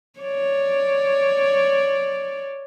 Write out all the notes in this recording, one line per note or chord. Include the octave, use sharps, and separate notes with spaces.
C#5 D5